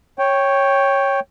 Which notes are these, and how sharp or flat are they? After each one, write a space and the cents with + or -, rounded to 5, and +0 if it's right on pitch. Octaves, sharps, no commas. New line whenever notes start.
C#5 -5 G5 +0